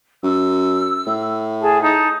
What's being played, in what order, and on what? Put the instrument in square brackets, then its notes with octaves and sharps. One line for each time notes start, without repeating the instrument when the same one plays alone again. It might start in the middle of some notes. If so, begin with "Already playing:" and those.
[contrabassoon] F#2 [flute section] E6
[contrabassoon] A2
[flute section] G#4 A5
D#4 A5